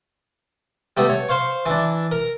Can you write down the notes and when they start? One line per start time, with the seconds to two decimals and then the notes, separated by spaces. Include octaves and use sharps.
0.97 G3 A3 B3
1.09 C#5
1.29 C5 F5 C#6
1.66 E3 D4
2.11 A#4